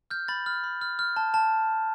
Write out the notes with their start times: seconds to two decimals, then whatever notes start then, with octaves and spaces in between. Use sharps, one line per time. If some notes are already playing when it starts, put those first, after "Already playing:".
0.10 F6 G6
0.28 B5 A6
0.46 F6
0.64 B5
0.81 F6
0.99 F6
1.17 A5
1.34 A5